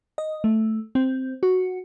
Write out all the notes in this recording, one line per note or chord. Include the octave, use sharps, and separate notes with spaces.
D#5
A3
C4
F#4